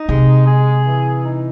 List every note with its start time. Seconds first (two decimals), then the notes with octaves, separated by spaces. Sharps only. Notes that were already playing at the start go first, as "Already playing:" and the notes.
Already playing: D#4
0.09 C3 G#3
0.47 G#4
0.86 E3
1.25 D#4